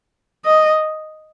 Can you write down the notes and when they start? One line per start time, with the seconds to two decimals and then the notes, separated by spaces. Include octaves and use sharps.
0.45 D#5